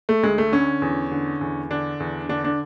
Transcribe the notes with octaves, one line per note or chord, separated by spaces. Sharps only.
A3
D2 G#3
A3
D3 C#4
E2
D3
E2
D3 D4
E2
D3 D4
D4